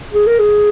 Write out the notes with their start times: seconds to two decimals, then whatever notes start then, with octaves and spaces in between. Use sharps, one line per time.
0.13 G#4
0.27 A#4
0.39 G#4